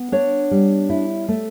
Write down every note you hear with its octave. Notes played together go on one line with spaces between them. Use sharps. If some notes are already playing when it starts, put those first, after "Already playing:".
Already playing: B3
D4 C#5
G3
E4
A3